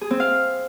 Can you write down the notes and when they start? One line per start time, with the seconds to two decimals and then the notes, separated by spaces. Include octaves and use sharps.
0.01 G#4
0.11 C4
0.20 F5